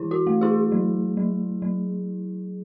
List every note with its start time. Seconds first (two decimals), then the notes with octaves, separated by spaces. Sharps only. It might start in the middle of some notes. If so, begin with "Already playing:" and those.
Already playing: E3 E4
0.11 F#4
0.27 A3
0.41 E4 G#4
0.72 F#3
1.17 F#3
1.62 F#3